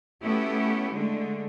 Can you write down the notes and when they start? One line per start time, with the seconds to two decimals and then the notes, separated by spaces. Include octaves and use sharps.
0.21 A3 B3 C#4 E4 F#4 G4
0.92 D3 G#3 A3